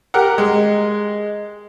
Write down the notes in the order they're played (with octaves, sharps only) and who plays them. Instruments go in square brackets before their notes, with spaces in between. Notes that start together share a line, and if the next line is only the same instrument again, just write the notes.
[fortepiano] G4 A#4 F#5
G#3